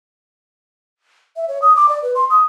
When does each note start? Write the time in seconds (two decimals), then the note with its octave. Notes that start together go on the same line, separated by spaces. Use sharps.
1.36 E5
1.48 C#5
1.62 D#6
1.76 D6
1.89 D5
2.02 B4
2.15 C6
2.30 D#6